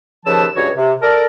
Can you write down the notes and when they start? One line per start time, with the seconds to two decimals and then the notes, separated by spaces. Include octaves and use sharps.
0.25 D#2 C#3 F3 B4 A5 E6
0.55 C#2 G2 F#4 C#5
0.76 C3
1.02 A4 A#4 D5